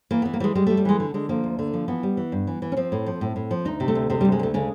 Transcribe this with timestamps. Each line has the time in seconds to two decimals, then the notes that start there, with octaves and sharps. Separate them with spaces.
0.11 E3 A#3
0.22 E3 B3
0.34 A#3
0.40 E3 G3 G#3
0.55 G3 G#3
0.67 G3 A3
0.77 G3
0.85 E3 G#3
1.00 D3
1.14 D3 G#3
1.29 F3 A#3
1.44 D2
1.59 D3
1.73 F3
1.88 E3 B3
2.03 G3
2.17 E3
2.32 G2
2.47 E3
2.62 E3
2.72 C#4
2.77 F3 C4
2.92 A2
3.06 F3
3.21 A2
3.36 A2
3.51 F3
3.65 D2 D#4
3.80 C3
3.88 A3
3.95 D2
4.10 C3 G#3
4.21 D2 G3
4.32 G#3
4.39 D2 A3
4.54 C#3 G#3